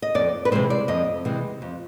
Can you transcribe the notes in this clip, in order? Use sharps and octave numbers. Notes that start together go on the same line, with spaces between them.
D#5
F2 D5
B4
C3 E3 G#3 C4 C5
D5
F2 D#5
C3 E3 G#3 C4
F2